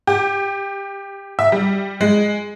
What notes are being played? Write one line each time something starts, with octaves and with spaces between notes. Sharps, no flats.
G4
E5
G3
G#3